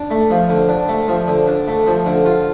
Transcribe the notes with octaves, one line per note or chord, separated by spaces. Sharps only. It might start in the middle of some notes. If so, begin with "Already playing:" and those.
Already playing: D4
A3
F3
D3
D4
A3
F3
D3
D4
A3
F3
D3
F4